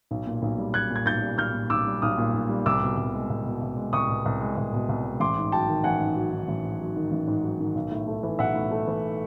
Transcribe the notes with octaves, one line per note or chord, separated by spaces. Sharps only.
B1
A#2
B1
G3
B1 F#6 G#6
A#2
G#6
B1 G6 A6
G3
B1 F6 G6
A#2
B1 D6 E6
G3
B1 D#6 F6
A#2
B1
G3
C2 D6 E6
B2
C2
G#3
C2
B2
C2
G#3
C2 C#6 D#6
B2
C2
G#3
C2
B2
C2
G#3
A1 C6 D6
G#2
F#3 G5 A5
D#3
A1 F#5 G#5
G#2
F#3
D#3
A1
G#2
F#3
D#3
A1
G#2
F#3
D#3
B1
A2
A3
E3
B1 E5 F#5
A2
A3
E3